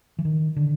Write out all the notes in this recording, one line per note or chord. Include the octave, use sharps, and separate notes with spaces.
E3
D#3
D3